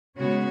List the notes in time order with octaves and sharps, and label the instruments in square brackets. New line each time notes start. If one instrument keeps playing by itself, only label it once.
[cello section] C#3 G#3 B3 F#4 C#5